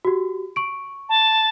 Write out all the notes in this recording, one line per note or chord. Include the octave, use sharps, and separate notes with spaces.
F#4 G4
C#6 D7
A5